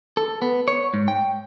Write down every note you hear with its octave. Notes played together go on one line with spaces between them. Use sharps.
A4
B3
C#5
G#2
G5